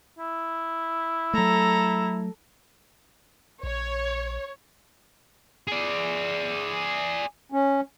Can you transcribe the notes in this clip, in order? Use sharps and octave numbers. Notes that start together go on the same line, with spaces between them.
E4
F#3 A3 A4 A#5
A#1 C#5
G#4 D5
C#4